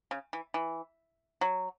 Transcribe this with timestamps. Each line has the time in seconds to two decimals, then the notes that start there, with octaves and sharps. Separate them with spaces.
0.11 C#3
0.33 E3
0.54 E3
1.41 F#3